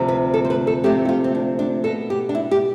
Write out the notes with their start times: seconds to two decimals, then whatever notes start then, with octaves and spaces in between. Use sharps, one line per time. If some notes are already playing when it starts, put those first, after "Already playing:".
Already playing: D2 C3 F3
0.08 B4
0.34 A4
0.45 C5
0.50 B4
0.67 A4
0.84 D2 C3 F3 A3 C4 G4
1.05 E4
1.09 F4
1.24 C4
1.35 D4
1.59 D4
1.84 B2 B3 A4
2.10 G4
2.29 D4
2.35 E4
2.51 G4